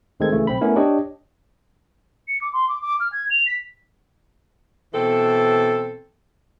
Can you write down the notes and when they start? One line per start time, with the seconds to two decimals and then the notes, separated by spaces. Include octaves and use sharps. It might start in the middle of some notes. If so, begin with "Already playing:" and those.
0.20 D2 D#3 G#3 C4 A4 G#6
0.32 C#3 E3 A3
0.47 B1 C4 B5
0.61 A3 B3 C#4 E4 A#4
0.76 D4 G4 C#5 D#5
2.28 C#7
2.41 D6
2.53 C6
2.69 D6
2.81 D6
3.00 F6
3.12 G#6
3.30 F7
3.47 B6
4.93 B2 E3 C4 A4